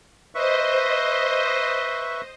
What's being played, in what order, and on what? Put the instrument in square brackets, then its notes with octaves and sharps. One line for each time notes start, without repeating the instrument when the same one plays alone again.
[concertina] B4 E5 C#6 [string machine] C5 D#5